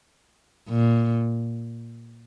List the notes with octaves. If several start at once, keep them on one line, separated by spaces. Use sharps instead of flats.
A#2